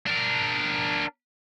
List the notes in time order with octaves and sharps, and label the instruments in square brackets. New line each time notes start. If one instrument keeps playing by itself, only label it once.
[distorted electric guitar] D4 A#4